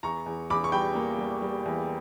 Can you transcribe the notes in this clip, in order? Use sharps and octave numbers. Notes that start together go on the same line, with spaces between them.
E2 A#5 C#6
E2
E2 B5 D6
C#6
G3 G5 B5
A#3
G3
G3
E2